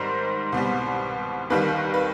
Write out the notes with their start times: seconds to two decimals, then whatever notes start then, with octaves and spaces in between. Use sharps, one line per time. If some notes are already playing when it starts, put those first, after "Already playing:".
Already playing: G#2 D#3 G3 C5
0.52 C2 B2 G3
1.50 D#2 D#3 G3 B4
1.94 B4